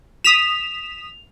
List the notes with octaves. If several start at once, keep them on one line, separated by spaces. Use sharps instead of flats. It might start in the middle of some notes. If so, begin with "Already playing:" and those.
D#6 B6 E7 F7